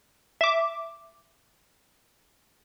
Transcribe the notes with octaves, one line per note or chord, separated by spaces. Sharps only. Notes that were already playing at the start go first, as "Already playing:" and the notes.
E5 D6